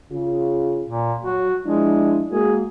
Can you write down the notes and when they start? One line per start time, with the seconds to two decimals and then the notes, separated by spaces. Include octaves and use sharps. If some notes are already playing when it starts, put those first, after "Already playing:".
0.12 C#3 F4
0.88 A#2
1.25 F#3 F#4
1.65 F3 G#3 D4 E4
2.31 G#3 A#3 F#4 G#4